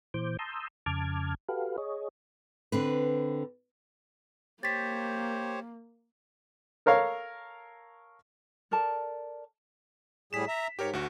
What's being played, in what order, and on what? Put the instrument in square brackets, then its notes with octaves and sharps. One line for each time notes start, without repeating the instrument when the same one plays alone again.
[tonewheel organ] A#2 E3 C5 D6 G6
A5 A#5 C6 D#6 E6 G6
F2 C#3 A5 D6 F6 G#6
F#4 G4 A4 B4 F5
G#4 C#5 D#5
[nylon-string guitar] D3 C4 B4
[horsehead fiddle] A#3 [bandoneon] G4 C5 C#5 [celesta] A6 B6
[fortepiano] A4 A#4 C#5 F5
[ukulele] A4 A#4 D5 A5
[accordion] A2 G3 G#4 [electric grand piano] B6 E7
[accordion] E5 A#5
[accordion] G#2 [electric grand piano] G4 A#4 C#5
[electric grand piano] D2 F#4